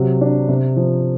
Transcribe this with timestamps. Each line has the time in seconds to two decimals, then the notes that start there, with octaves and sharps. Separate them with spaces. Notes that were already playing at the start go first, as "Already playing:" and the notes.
Already playing: C3 F#3
0.21 D4
0.48 C3
0.76 F3